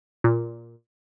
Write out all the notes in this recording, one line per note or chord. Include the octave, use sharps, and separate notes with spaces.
A#2